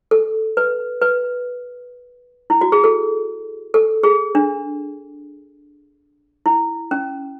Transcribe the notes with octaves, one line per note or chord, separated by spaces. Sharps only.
A4
B4
B4
E4
F#4
G#4
A4
A4
G#4
D4
E4
C#4